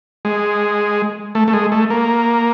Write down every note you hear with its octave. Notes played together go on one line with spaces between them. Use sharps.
G#3
A3
A3
G#3
A3
A#3